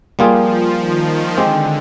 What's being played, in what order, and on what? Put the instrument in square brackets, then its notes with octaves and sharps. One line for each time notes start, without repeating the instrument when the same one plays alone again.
[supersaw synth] F3 [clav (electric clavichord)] G3 A#3 F4 G#4
[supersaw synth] D#3
[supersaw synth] D3 [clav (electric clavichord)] G#3 C4 G4